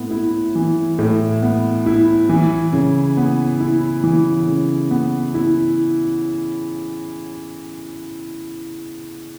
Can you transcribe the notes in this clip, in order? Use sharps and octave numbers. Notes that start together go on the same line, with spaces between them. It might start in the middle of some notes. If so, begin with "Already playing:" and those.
Already playing: A2 B3
E4
E3
A2
B3
E4
E3
C#3
B3
E4
E3
C#3
B3
E4